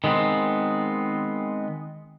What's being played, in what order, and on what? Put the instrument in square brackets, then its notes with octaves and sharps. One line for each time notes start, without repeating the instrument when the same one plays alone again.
[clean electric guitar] D#3 G#3 B3 C4